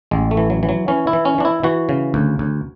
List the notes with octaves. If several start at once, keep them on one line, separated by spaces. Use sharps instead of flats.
A1 G#3
A3
E3
F#3
E3
F#3
E3 C#4
E4
E3
C#4
E3 D4
E4
E3 F#4
C#3
D2
D2